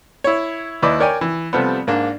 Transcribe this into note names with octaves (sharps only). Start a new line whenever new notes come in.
E4 C#5
D#2 E4 B4 D5 D#5 D6
A#4 C#5 D5 G5 G#5
E3
C3 F3 G3 A3 B3
G#2 A#3 D4